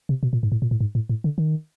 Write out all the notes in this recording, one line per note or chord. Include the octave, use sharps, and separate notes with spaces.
C3
B2
A#2
G#2
A2
A#2
A2
G#2
A2
A2
D3
D#3